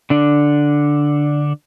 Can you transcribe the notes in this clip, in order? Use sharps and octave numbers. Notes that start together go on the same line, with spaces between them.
D3 D4